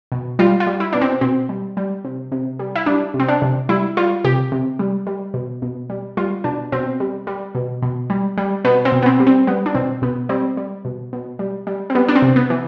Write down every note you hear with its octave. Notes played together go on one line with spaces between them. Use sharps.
B2
G3 F4
F4
G3
E4
B2 D4
C4
B2 C4
G3
G3
C3
C3
G3
E4
G3 D4
C3
C4
D4
C3
G3 E4
G3 F4
C3 G4
C3
G3
G3
B2
B2
G3
G3 F4
B2 D4
B2 C4
G3
G3
B2
B2
G3
G3
B2 B3
C4
B2
B3
C4
G3
C4
G3 B3
D4
B2 C4
B2 B3
G3 C4
G3
B2
B2
G3
G3
C4
G3 B3
D4
C4
C3
B3
E3